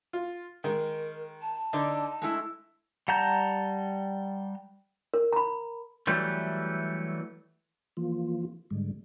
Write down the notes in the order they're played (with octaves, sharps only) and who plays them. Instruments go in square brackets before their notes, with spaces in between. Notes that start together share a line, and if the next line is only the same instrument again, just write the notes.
[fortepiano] F4
[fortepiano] D#3 G#3 [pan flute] A#4
[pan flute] A5
[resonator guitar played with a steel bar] D3 D5 [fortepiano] D#4
[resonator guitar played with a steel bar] G#3 A3 E4
[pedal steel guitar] G3 F#5 A5 A#5 G6
[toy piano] A#4
A#5 B5
[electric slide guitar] E3 F#3 G3 A3
[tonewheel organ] E3 F3 A#3 F4
G#2 D3 G3 G#3